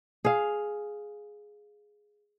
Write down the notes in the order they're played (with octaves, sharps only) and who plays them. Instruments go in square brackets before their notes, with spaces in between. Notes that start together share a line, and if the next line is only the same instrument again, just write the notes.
[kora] G#4 F5